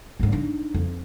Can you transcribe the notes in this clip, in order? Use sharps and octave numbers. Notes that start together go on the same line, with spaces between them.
A#1 G#2
D4 D#4
F2